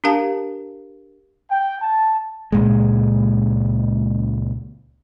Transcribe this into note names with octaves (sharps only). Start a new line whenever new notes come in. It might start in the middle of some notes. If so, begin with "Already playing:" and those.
D4 G4 A#4 F5 A5
G5
A5
C#2 A#2 G#3